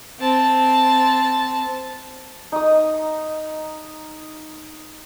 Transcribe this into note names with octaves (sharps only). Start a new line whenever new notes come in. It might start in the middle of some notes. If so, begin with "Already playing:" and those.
C4 A5
D#4 D#6